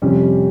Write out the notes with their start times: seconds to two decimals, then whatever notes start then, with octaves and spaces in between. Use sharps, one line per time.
0.02 F2 C3 G3 C#4